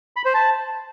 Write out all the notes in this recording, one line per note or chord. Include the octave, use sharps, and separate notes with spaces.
B5
C5
A5